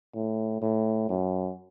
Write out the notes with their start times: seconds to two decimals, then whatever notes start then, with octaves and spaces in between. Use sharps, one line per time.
0.15 A2
0.62 A2
1.09 F#2